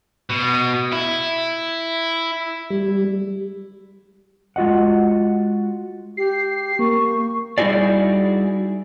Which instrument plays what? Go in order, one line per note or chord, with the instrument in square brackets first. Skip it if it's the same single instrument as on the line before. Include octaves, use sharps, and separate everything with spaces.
[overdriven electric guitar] B2
E4
[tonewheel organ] G3
[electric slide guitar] G#3 F4 F#4 D#5 F#5
[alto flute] G4 [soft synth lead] C7
[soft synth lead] A#3 [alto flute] C#6
[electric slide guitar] G3 D#4 E4 F#4 G#4 D5